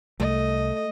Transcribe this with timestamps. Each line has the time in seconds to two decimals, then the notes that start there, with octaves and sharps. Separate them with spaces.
0.20 C2 A3 D#5